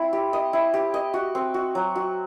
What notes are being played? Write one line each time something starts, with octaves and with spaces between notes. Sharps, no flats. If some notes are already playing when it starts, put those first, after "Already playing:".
Already playing: C4 E4
G4
D#5
E4
G4
D#5
F#4
C4
F#4
F#3
F#4